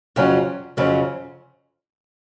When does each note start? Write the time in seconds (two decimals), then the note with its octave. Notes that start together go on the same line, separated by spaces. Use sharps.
0.16 F2 C#3 F#3 C#4
0.77 F2 C#3 F#3 C#4